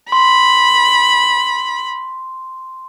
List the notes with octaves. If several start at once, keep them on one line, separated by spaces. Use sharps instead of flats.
B5 C6